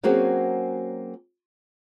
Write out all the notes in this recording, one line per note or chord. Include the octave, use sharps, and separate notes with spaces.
F#3 A#3 C4 C#4 F#4 G#4